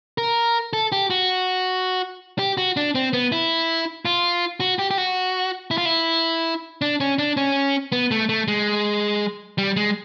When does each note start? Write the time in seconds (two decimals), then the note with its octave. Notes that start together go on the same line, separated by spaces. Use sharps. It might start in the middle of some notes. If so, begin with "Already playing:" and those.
0.18 A#4
0.73 A4
0.92 G4
1.10 F#4
2.39 G4
2.57 F#4
2.77 D4
2.95 C4
3.13 B3
3.32 E4
4.05 F4
4.60 F#4
4.79 G4
4.91 G4
4.98 F#4
5.71 E4
5.78 F4
5.85 E4
6.82 D4
7.00 C#4
7.19 D4
7.37 C#4
7.92 B3
8.11 A3
8.29 A3
8.48 G#3
9.58 G3
9.76 G#3